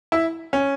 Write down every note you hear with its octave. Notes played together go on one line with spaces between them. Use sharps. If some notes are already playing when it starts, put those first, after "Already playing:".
E4
C#4